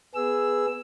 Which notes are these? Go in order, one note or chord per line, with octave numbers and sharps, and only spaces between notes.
B3 G#4 E6